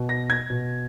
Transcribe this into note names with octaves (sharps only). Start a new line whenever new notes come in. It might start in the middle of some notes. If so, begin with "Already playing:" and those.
Already playing: B2
A#6
G#6
B2